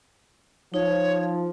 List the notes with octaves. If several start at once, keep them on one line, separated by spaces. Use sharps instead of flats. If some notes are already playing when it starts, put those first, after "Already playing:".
F3 D#4 C#5